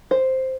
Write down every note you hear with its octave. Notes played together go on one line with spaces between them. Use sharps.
C5